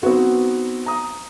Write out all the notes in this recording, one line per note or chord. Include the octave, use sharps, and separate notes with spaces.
B3 C4 D#4 F#4 B4
A#5 D#6